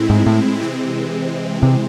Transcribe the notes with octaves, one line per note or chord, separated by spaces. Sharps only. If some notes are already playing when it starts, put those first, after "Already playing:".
Already playing: A2 G#3 C4 E4
G#2
A2
C3 E3 G#3 C4
C3